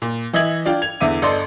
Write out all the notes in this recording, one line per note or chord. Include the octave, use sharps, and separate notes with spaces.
A#2
E3 D#5 E5 G#6 F#7
D4 F4 G5
G#6 F7
E2 D3 E5 D6 D#7
G1 A4 D5 D#5 C6